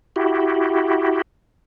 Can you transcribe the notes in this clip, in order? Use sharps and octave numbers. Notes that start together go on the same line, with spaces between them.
E4 F#4 G4